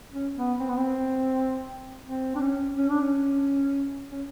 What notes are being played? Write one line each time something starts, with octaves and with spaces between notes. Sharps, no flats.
C#4
B3
C4
B3
C4
C4
D4
C#4
C#4
D4
C#4
C#4